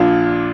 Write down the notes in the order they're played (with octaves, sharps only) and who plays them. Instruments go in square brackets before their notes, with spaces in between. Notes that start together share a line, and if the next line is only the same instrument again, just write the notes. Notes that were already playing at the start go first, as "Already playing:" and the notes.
Already playing: [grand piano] A#1 A#2 D4 F4